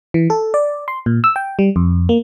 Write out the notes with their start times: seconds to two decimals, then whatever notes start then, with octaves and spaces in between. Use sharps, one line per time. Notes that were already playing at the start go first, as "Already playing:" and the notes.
0.14 E3
0.30 A4
0.54 D5
0.88 C6
1.06 A#2
1.24 E6
1.36 G5
1.59 G3
1.76 F2
2.09 A#3